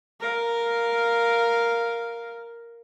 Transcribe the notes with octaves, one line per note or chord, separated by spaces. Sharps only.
A#4 F5